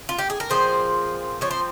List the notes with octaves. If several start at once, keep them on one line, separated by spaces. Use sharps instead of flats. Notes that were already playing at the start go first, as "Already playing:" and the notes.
F4
G4
G#4
A#4
A#2 F3 C4 G#4 C5
F3 C4 C#5
C5